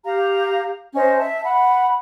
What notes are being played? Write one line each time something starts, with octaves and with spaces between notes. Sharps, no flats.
G4 F5 A#5
C#4 C5 D#5
E5 A5
F#5 B5